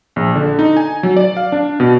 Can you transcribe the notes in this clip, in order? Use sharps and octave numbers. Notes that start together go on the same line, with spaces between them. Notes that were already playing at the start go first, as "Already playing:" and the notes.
A#1
D3
D#4
G#5
F#3
D5
F5
D4
B2